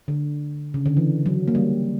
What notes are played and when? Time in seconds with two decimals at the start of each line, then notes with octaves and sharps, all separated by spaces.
0.08 D3
0.74 C#3
0.86 D3
0.97 E3
1.26 F#3
1.48 A#3
1.55 G3